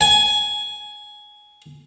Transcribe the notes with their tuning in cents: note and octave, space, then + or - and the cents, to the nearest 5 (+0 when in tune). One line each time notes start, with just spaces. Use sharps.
G#5 +10